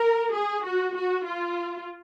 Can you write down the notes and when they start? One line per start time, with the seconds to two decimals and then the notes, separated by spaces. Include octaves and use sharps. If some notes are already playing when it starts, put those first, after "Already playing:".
Already playing: A#4
0.34 G#4
0.65 F#4
0.96 F#4
1.27 F4